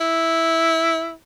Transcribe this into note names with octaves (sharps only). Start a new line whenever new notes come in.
E4